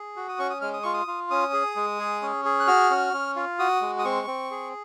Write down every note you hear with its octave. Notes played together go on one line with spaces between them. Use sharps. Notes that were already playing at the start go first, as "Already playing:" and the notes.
Already playing: G#4
F#4
D#6
C#4 C#6
D#6
G#3 F6
D#6
F4 C#6
D#6
F4
C#4 D#6
G#4
G#3
G#4
C#4
G#4
F#6
F#4 F6
C#4
C#4
F4
F#4 D#6
G#3
D#6
C4 C#6
C4
G#4